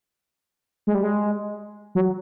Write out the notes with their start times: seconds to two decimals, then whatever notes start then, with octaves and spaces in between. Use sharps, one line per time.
0.87 G#3
0.95 G3
1.03 G#3
1.95 F#3